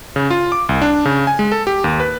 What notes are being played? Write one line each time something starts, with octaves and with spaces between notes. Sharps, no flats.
C#3
F4
D6
C2
D4
C#3
G#5
G#3
A4
G4
D#2
B4